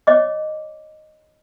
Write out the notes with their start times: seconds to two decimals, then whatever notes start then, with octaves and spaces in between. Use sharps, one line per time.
0.07 C#5 D#5 D6